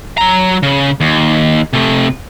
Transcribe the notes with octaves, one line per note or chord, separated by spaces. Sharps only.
F#3 A#5
C#3
D#2
C3 A3